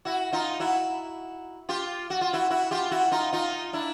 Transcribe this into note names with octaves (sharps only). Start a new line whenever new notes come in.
E4 F#4
D#4 F4
E4 F#4
F4 G4
F#4
F4
E4 F#4
E4 F#4
F4 G4
E4 F#4
D#4 F4
D#4 F4
D4 E4